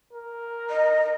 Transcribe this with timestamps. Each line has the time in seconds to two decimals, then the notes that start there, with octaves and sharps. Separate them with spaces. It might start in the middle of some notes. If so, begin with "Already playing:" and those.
0.13 A#4
0.70 D#5